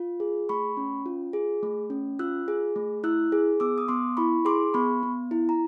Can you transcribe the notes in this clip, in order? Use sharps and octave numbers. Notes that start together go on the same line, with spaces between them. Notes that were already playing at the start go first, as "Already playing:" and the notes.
Already playing: F4
G#4
A3 B5 C#6
C#4
F4
G#4
A3
C#4
F4 E6 F#6
G#4
A3
E4 E6 F#6
G#4
B3 D6 E6
D#6
B3 C6 D6
E4 B5 C#6
G#4 C6 D6
B3 B5 C#6
B3
E4
A#5